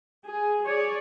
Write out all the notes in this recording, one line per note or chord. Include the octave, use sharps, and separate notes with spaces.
G#4
G#4 C#5 D5